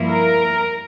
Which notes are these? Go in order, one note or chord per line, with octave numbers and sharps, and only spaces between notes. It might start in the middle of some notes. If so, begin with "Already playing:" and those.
Already playing: G2 F3 A#3 E4
A#4